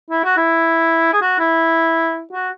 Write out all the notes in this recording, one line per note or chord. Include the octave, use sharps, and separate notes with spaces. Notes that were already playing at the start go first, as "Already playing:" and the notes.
E4
F#4
E4
G#4
F#4
E4
F#4